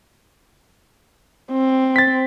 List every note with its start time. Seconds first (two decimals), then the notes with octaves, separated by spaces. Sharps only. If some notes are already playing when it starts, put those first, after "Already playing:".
1.52 C4
1.96 A6 B6